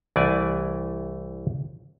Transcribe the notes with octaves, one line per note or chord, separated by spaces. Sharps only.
C2 E3 A3 D5 G#5